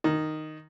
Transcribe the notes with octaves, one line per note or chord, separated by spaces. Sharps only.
D#3